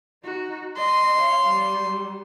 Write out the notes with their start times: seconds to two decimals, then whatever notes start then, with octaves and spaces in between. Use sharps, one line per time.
0.24 D#4 F#4
0.77 D#5 C6
1.18 C#5 F5
1.47 G3